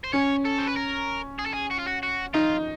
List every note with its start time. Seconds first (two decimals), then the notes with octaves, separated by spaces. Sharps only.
0.04 C5
0.13 C#4 C#5
0.45 A4
0.59 C5
0.67 B4
0.77 A#4
1.39 G#4
1.46 A4
1.54 G#4
1.71 F#4
1.79 F4
1.87 F#4
2.03 F#4
2.34 D#4 F4